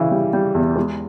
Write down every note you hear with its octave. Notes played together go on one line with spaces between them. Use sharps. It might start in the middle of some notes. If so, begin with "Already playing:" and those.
Already playing: C#3 E3
G3
G3
E2
G#3